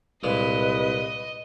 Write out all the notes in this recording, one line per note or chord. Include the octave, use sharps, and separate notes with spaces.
C2 A#2 G#3 B4 D#5